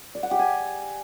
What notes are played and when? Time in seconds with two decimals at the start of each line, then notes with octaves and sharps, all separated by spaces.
0.15 D5
0.23 F#5
0.31 G4
0.39 G#5